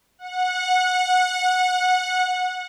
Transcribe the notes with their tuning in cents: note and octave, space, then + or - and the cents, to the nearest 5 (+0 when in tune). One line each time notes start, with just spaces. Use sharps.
F#5 -20